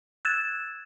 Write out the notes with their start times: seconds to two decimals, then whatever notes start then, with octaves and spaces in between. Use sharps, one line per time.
0.25 E6 F#6 G#6 A6 E7